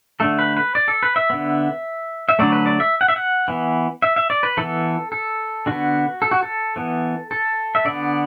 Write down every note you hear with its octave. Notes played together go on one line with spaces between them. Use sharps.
D3 A3 A4
B4
B4
D5
A4
B4
E5
D3 B3
E5
D3 F#3 A3 D5
B4
D5
E5
F#5
E5
F#5
E3 B3
E5
E5
D5
B4
E3 B3 A4
A4
D3 B3 F#4
A4
F#4
A4
E3 B3
A4
E5
D3 B3 D5